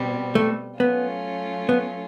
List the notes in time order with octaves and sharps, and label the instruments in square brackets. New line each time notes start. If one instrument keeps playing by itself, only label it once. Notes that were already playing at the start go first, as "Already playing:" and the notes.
Already playing: [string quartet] B2 G3 C4
[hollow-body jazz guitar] A3
[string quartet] F#3 A3 C#4 F4 [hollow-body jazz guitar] B3
[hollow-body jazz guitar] B3